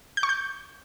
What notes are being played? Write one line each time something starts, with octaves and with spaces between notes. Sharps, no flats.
G6
C#6
G6